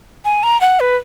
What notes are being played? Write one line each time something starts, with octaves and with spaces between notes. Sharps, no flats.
G#5
A#5
F#5
B4